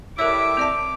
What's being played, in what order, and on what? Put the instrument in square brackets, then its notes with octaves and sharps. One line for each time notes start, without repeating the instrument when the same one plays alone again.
[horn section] G3 E4 A4 [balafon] A#4 C#5 [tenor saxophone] E5 [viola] D6
[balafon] C4 D5 A5